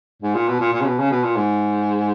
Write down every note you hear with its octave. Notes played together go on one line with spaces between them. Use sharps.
G#2
A#2
B2
A#2
A#2
C#3
B2
C#3
B2
A#2
G#2